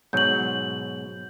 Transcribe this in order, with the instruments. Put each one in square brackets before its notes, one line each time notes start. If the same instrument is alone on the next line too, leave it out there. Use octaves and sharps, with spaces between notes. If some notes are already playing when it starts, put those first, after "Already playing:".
[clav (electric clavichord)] G#2 B2 F#3 [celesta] G6 F#7